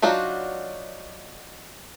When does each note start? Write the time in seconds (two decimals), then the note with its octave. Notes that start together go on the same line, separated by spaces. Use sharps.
0.02 F#3 D4 D#4 F4 F#4